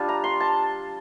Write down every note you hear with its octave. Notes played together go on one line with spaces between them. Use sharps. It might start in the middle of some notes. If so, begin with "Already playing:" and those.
Already playing: G3 D4 F4
A#5
C6
A5